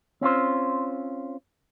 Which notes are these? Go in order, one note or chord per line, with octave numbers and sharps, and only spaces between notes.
C4 C#4 F4 C5